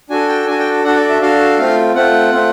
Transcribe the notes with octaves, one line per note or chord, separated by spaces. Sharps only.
D4 F#4 A4 G#5
G5
D4 F#4 A4 G#5
G5
D4 F#4 A4 F#5
D5
E5
D4 F#4 A4 F5
A3 C4 F4 F5
A3 C4 F4 F#5
A3 C4 F4